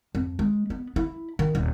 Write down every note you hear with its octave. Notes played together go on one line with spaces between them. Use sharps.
F2
G#3
B3
E4
D#3
D#1